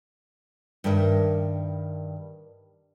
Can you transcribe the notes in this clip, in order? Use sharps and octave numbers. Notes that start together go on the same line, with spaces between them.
G2 D#3 A#4 E5